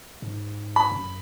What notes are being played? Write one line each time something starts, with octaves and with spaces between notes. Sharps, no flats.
G#2
B5
F#2